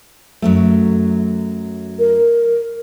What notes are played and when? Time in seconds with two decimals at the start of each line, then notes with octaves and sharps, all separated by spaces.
0.42 F#2 F#3 A3
1.99 A#4